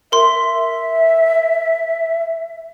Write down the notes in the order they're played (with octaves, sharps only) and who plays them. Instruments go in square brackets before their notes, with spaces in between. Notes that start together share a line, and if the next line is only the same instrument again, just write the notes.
[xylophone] A#4 C6 [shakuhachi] E5